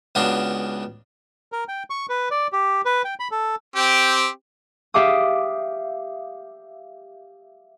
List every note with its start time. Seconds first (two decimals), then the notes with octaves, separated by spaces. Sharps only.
0.15 C#2 C#3 B3 D4 F#4 C6
1.52 A#4
1.68 G5
1.90 C#6
2.09 B4
2.31 D5
2.52 G4
2.85 B4
3.04 G5
3.20 B5
3.31 A4
3.76 C4 G4
4.94 G4 E5 F5 D6 D#6